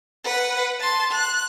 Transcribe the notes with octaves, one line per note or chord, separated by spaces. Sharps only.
B4 F#5
A5 C6
F#6